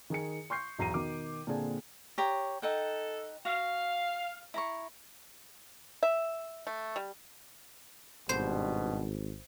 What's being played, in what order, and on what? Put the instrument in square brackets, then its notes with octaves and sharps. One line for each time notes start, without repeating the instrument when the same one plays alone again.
[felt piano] D#3 G#4 C#7
C6 C#6 G6 C7
B1 E2 A#5 C7 D#7
B2 D#3 D6
A#2 D3 C4 D4 G#4
[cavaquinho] G4 C#5 A#5
[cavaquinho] D#4 F#5 G5 [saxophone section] A4
[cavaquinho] F#4 [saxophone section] F5
[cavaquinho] E4 A#5 C#6
[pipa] E5
A3
G3
[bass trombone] G#1 [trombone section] G2 B2 [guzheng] C5